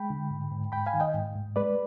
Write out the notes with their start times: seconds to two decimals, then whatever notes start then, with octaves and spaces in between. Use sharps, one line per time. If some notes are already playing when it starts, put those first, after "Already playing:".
Already playing: G#3 G5 B5
0.10 D3
0.31 G#2
0.52 G#2
0.72 G#2 G5 B5
0.86 F5 G#5
0.94 D#3
1.00 D#5 G5
1.14 G#2
1.36 G#2
1.56 G#3 B4 D5